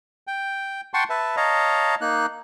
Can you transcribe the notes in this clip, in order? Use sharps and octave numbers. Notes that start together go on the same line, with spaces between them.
G5
F#5 G5 A5 C6 C#6
B4 E5 A5
C#5 D#5 F5 A5 A#5
A#3 D#4 F#6